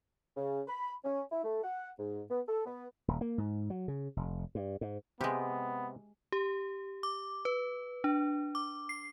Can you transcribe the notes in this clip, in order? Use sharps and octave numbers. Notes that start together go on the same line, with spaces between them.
C#3
B5
C#4
E4
A3
F#5
G#2
B3
A4
B3
D#1
A#3
G#2
F#3
C#3
F1
G2
G#2
C3 G#3 B3 G4 B4 D#5
G4
D6
B4
D4
D6
C7